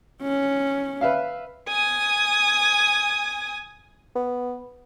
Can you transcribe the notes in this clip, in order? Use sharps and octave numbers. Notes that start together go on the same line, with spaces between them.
C#4
B4 E5 F5
G#5 D#6
B3